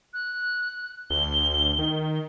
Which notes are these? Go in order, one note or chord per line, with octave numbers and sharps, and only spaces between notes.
F#6
D2 G7
D#3